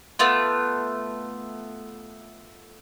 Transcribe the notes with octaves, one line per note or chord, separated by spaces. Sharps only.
A3 B3 F4